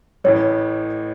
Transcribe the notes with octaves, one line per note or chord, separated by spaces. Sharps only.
A1 A2 E3 C#5